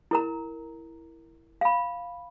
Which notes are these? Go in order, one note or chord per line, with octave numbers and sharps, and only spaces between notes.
E4 A#4 A#5
F5 B5